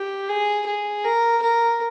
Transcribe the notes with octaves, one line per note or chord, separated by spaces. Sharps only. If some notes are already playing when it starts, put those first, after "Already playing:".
Already playing: G4
G#4
G#4
A#4
A#4